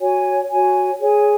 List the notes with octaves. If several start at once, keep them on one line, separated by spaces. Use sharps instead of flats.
F#4 C#5 G#5
F#4 C#5 G#5
G#4 C#5 G#5